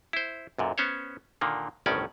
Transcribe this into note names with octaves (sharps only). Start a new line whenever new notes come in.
E4 C5
B1 F#2 A#2
B3 C#4 C5 C#5
A#2 D3 D#3 A#3
G1 C2 A2 D#3 C#4 D5